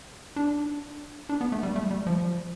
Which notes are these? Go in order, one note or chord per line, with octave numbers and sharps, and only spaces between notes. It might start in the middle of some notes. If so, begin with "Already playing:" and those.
D4
D4
B3
A3
G3
A3
G3
F3